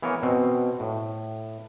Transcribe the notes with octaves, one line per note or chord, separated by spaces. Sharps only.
E3 B3 A#4 C#5 F5 G#5
B2 C4
A2